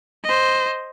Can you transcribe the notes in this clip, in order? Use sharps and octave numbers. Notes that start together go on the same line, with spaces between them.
C5 D#5